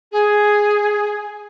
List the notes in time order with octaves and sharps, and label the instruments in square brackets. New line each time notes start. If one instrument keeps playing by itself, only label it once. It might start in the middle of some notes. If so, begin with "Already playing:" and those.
[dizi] G#4